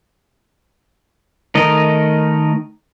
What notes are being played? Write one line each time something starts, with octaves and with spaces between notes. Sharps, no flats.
D#3 A3 A#4 D#5